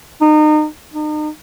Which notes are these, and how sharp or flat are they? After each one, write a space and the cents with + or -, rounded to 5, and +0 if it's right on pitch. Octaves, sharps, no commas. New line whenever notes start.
D#4 -30
D#4 -40